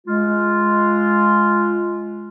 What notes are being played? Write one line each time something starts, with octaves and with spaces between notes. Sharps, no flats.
G#3 F4